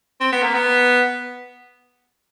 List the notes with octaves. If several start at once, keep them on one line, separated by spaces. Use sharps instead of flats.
C4
B3
A#3
B3